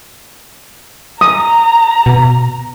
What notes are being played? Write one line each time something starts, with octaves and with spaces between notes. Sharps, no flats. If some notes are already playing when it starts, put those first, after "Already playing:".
A#5 D#6
B2